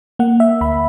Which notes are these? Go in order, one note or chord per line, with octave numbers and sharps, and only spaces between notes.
A#3 F#5
E5
D2 B5